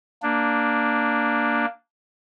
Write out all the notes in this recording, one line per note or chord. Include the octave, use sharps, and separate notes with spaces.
A#3 D4